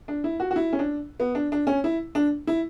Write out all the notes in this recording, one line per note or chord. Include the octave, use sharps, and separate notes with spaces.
D4
E4
F#4
F#4
E4
C#4
D4
B3
D4
D4
C#4
E4
D4
E4